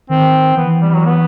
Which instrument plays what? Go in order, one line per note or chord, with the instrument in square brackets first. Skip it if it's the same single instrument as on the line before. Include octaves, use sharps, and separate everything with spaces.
[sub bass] D#3 [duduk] C4
[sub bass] E3 [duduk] B3
[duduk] G3
F#3
B3